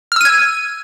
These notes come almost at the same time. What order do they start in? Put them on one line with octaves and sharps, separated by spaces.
F6 E6 D#7 G#6